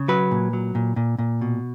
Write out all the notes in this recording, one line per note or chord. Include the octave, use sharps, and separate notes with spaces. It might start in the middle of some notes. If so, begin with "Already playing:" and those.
Already playing: C#3
F#3 B4
A#2
F#3
A#2
A#2
A#2
B2